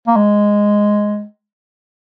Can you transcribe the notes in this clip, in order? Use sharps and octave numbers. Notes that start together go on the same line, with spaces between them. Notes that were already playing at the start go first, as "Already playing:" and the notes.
A#3
G#3